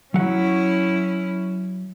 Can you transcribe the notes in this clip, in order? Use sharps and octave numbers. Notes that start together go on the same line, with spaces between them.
F#3 C#4 E4 F#5